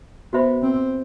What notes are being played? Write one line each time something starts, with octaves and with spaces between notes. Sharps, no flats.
B3 F#4 C5 E5 B5
C4